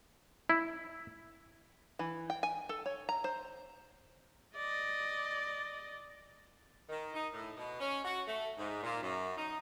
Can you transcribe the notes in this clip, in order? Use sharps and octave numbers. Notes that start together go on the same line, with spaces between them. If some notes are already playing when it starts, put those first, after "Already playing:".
E4
E3
G5
G#5
A4
C#5
A#5
C5
D5 D#5
D#3
D#4
A2
B2
C#4
F#4
A3
G#2
A#2
F#2
D#4